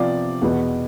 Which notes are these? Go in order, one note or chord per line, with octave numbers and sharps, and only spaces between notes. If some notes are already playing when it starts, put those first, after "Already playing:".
Already playing: C3 F3 B3 D5 F5
E2 B2 B3